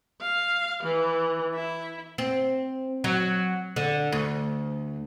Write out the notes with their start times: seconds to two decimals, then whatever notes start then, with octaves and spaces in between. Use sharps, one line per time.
0.21 F5
0.83 E3
1.55 E4
2.18 C4
3.04 F#3
3.76 D3
4.12 D2